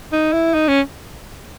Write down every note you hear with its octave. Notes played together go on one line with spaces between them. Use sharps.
D#4
E4
D#4
C#4